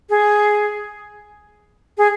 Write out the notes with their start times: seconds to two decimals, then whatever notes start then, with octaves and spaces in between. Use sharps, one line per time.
0.10 G#4
1.98 G#4